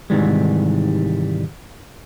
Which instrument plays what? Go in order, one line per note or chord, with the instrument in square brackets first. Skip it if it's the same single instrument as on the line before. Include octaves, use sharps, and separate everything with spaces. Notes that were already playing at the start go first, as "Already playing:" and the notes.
[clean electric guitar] G#2 C3 D#3 E3 G3 G#3